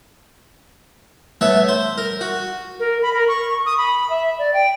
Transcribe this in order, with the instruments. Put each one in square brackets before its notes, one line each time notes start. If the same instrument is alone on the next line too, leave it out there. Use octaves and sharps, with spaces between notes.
[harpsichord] A3 B3 C#5 E5
C5
A#4
F#4
[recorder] A#4
B5
A#4
C#6
D#6
B5
E5
D5
G5